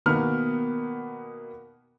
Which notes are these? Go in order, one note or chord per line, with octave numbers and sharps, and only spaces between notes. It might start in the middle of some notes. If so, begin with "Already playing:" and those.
B2 D#3 A#3 B3 A#4 F6